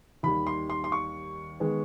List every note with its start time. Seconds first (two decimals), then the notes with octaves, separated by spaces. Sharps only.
0.23 D#2 D#3 G3 B5
0.47 C6
0.70 C6
0.84 C6
0.92 C#6
1.60 D#3 G#3 B3